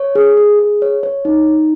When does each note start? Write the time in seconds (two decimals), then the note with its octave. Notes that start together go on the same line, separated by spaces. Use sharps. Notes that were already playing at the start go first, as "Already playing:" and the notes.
Already playing: C#5
0.15 G#4
0.37 G#4
0.59 G#4
0.82 C#5
1.03 C#5
1.25 D#4
1.47 D#4